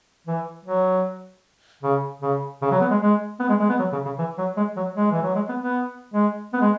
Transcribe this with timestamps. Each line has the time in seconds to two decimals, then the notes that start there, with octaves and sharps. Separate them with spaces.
0.27 E3
0.65 F#3
1.83 C#3
2.22 C#3
2.62 C#3
2.71 F#3
2.81 B3
2.91 G#3
3.01 G#3
3.40 B3
3.49 G#3
3.60 G#3
3.69 B3
3.79 F#3
3.93 C#3
4.05 C#3
4.18 E3
4.38 F#3
4.57 G#3
4.77 F#3
4.96 G#3
5.11 E3
5.23 F#3
5.35 G#3
5.49 B3
5.62 B3
6.14 G#3
6.54 B3
6.61 G#3